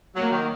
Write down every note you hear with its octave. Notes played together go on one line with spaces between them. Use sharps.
F#3 A#3
D#3